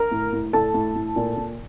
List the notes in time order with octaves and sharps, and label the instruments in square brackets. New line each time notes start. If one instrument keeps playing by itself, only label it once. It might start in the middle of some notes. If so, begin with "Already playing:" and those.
Already playing: [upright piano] A#4 A#5
A2
A2
A2 A4 A5
A2
A2
A#2
A#2